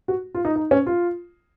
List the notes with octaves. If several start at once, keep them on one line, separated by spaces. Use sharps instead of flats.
F#4
F4
D#4
D#4
C#4
F4